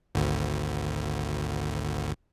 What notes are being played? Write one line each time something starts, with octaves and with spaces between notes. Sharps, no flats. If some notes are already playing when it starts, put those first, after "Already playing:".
G#1 D2